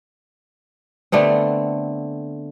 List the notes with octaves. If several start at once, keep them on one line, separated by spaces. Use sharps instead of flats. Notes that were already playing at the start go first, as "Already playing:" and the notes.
D3 A3 B3 C4